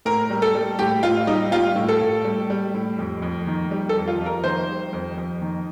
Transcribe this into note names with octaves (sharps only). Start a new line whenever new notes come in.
A2 A#4
G3
A4
G3
A2 G4
A2 F4
G3 D#4
G3 F4
A2
A4
A2
G3
G3
A2
F2
F2
D#3
G3
A4
F2
F4
F2
A#4
D#3 C5
G3
F2
F2
D#3